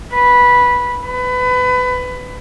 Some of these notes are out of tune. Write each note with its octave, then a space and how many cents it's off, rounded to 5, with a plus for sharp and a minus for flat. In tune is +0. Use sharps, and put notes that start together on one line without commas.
B4 -10
B4 +25